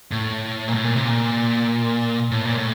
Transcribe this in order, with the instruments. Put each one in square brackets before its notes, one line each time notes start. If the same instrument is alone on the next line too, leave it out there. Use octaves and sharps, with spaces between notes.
[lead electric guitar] A2
A#2
A2
A#2
C3
A#2
A2
A#2
A2